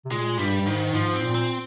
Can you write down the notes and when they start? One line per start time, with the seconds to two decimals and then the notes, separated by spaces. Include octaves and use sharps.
0.05 C3
0.11 A#2 G#3
0.39 G2 G3
0.61 G2
0.66 G#2 D#3
0.93 G#2 F3
1.14 C4
1.21 A#2
1.34 C4